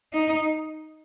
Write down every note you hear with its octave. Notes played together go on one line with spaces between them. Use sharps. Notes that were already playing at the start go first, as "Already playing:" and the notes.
D#4